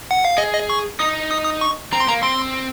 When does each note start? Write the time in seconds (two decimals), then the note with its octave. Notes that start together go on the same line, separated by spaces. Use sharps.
0.11 F#5
0.25 F5
0.38 G#4 D#5
0.54 D#5
0.70 C#6
0.99 D#4 D#6
1.31 D#6
1.44 D#6
1.61 C#6
1.93 C4 A#5
2.00 C6
2.08 A#3 A#5
2.22 C4 C6